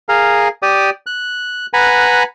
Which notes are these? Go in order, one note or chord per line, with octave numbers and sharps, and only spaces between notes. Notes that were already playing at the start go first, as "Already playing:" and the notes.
G#4 A#4 F5
G4 D5 D#6
F#6
B4 F#5 G#5 A#5 B5